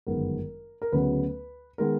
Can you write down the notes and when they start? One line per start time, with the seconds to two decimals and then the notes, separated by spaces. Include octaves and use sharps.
0.07 G1 F#2 D#3 G#3 B3 A#4
0.82 A#4
0.92 D2 C#3 F#3 B3 B4
1.78 D#3 G#3 B3 A#4